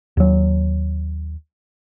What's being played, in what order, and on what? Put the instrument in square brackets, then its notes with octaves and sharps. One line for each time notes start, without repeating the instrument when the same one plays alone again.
[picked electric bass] D#2 F#3